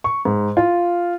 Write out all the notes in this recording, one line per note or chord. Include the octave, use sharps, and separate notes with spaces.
C#6
G#2
F4